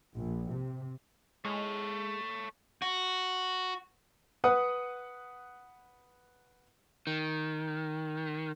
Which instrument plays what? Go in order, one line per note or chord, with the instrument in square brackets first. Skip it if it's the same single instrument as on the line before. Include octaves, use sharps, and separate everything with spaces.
[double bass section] A#1
C3
[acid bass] G#3 [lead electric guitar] A4 C#5
[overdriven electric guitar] F#4
[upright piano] B4 F#5 D#6
[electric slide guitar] D#3